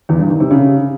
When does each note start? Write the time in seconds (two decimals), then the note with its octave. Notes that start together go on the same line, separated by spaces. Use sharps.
0.09 E2
0.19 G2
0.30 D#3
0.40 C3
0.51 C#3